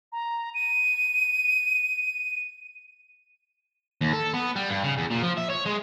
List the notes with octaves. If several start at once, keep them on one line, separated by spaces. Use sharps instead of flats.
A#5
D#7
D#2
A4
B3
G3
G2
C#3
E2
A#2
F3
E5
C#5
G#3